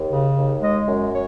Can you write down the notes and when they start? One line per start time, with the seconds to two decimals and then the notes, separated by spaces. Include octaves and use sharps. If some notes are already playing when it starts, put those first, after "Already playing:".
Already playing: D#2
0.09 C#3
0.36 D#2
0.61 G#3 D#5
0.87 F#2
1.12 C#5